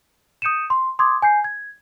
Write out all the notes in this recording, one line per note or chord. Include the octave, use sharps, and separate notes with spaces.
D#6 G6 C#7 D#7 E7
C6
C6 D6 D#6 G#6
G#5 G6 C7
G#6